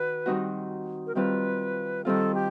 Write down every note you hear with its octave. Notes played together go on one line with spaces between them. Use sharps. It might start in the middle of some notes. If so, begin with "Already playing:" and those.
Already playing: D#3 F#4 B4
D#3 G3 C4 D#4 F#4
A#4
D#3 G3 C4 F4 B4
D#3 G3 C4 F4 A4
G4